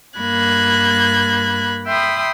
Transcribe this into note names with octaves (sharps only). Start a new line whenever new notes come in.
G2 A#3 B5 F#6 G#6
E5 G5 B5 C6 D#6